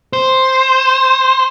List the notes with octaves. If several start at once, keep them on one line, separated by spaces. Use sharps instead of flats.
C5